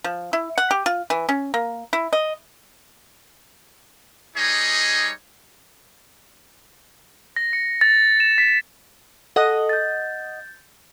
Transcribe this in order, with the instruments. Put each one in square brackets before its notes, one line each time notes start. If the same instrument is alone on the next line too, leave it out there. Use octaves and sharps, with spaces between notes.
[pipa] F3
E4
F#5
G4
F4
E3
C#4
A#3
E4
D#5
[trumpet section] G3 D#4 G#4 C#5 D#5
[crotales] A#6
C#7
A6
E7
B6
[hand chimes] A4 [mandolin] D#5 F#5 D#6
[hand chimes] G6 A6